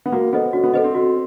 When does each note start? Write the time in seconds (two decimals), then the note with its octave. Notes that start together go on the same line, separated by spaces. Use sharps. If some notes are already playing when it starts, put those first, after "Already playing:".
0.06 B3
0.12 A#3 F#4
0.33 B3 A4 C5 D#5
0.53 C#4 F#4
0.64 B3
0.74 B3 A4 C5 D#5
0.84 C4
0.95 F#4